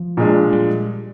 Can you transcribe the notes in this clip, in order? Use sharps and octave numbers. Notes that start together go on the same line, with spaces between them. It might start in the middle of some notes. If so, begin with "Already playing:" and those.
Already playing: F3
A#2 G#3 D4
G3